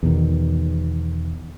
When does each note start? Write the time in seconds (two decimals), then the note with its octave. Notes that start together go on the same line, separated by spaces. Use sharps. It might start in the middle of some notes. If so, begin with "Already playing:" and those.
0.03 E2 B2 D#3